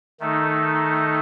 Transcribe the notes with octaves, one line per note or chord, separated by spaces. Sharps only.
D#3 A3 D#4 A4